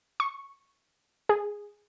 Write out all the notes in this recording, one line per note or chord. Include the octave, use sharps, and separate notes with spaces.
C#6
G#4